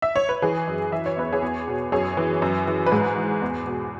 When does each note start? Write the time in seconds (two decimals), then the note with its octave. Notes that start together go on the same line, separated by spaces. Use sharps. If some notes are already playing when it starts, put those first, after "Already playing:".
0.02 E5
0.16 C#5
0.29 B4
0.42 E3 G#4
0.67 F#2
0.92 E3 E5
1.06 C#5
1.17 E2 B4
1.33 G#4 C#5
1.42 E2
1.68 B2
1.92 F#2 G#4 C#5
2.17 E3
2.42 F#2
2.67 E3
2.86 B4
2.92 G#2 G#4
3.17 E3
3.42 E2
3.67 B2